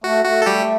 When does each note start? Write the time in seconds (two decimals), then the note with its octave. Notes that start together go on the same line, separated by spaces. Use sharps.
0.04 A3 F#4
0.25 A3 F#4
0.42 A4
0.46 G3 A3 G4